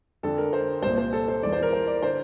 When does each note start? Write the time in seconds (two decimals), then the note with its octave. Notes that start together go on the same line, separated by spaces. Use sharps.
0.23 F2 D3 A4
0.38 A#4
0.53 C5
0.82 C2 A#2 C5
0.97 C5
1.13 A4
1.28 C5
1.43 E2 E3 D5
1.52 C5
1.62 A#4
1.72 C5
1.87 D5
2.02 D3 C5